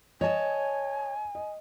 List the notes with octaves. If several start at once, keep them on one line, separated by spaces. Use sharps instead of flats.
C#5 D#5 G#5 A5
D#5